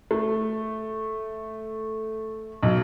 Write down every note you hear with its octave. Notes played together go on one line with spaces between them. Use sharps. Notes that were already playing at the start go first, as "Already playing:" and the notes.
A3
B1